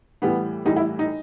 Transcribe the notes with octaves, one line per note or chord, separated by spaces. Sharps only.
A2 E3 G3 B3
A2 E3 G3 D#4
E4
D#4